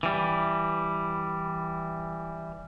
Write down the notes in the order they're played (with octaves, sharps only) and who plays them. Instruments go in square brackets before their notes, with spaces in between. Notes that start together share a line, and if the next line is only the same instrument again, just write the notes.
[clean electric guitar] E3 G3